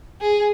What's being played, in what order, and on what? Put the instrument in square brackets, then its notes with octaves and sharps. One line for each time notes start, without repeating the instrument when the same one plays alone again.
[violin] G#4